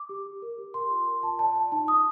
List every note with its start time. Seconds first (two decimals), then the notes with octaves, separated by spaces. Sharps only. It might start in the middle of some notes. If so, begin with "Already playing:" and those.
Already playing: D6
0.09 G4
0.26 G4
0.42 A#4
0.58 G4
0.74 A#4 C6
0.91 F4
1.07 A#4
1.23 F4 A5
1.39 D5 A5
1.56 F4 A5
1.72 D#4 A5
1.88 D#4 D#6